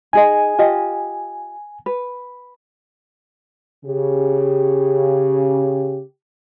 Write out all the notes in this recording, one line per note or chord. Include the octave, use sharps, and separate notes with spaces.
D#4 G#4 D#5 G#5
F4 G4 D#5
B4
C#3 G4